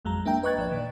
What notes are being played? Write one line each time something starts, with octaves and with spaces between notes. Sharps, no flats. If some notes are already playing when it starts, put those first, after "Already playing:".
G#1 F2 F#3 G#3 A#5
A#3 D4 E5 G5 A#5
B4 D#5 C#6 F#6 G#6 A6
G#1 F3 D5
A#2 D#3